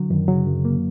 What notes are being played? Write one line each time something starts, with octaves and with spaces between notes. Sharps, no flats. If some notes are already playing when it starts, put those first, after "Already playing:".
Already playing: D3 F#3
F#2 D#3
C#3 F#3
F#2
A#3